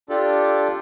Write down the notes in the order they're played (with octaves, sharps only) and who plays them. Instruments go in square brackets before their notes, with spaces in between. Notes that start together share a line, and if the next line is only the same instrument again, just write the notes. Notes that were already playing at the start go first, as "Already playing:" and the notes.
[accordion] D4 F4 G4 A4 D5